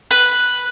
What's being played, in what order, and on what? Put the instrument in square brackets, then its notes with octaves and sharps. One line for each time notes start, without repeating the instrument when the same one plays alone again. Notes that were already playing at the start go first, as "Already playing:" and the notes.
[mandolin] B4